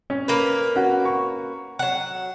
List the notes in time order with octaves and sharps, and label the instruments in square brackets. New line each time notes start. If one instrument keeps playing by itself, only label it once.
[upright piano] C#4
[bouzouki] A#3 B4
[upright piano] C#4 F#4
C#6
[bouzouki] F#3 F#5